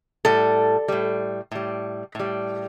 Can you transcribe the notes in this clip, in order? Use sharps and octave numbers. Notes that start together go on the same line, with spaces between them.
A2 G3 A4
A2 G3
A2 G3
A2 G3